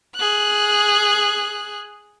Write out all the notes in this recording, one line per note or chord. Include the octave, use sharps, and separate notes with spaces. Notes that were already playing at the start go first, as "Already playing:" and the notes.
G#4 F#6